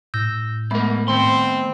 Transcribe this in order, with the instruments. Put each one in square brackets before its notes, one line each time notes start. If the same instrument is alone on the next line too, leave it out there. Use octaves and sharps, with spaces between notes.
[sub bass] A2 [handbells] E6 G6 A#6
[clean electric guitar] G#3 A#4 [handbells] A3 B3 B5
[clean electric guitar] D#3 C6 [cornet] C4